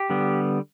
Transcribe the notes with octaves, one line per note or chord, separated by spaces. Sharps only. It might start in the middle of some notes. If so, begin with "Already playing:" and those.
Already playing: G4
D3 G3 B3